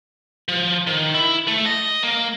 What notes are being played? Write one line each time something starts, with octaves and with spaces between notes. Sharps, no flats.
F3
D#3
E4
A3
D#5
A#3